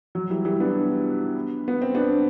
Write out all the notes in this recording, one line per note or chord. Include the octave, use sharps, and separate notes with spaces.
F#3
E3 G3
E3 G3
B3 D4
B3
C4
B3 D4